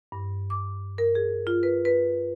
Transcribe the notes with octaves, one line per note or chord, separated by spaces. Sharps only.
G2
D6
A#4
G#4
F4
B4
B4